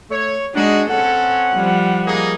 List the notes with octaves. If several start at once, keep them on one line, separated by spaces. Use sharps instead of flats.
A3 C#5
G#3 D4 D#4 F#4 G#4
C4 C#4 A4 F#5
F3 G3
A#3 D#4 G#4